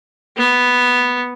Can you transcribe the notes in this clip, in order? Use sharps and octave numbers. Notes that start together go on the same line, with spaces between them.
B3